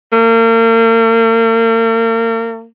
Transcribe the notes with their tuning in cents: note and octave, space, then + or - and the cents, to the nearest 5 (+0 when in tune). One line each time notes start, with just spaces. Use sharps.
A#3 -40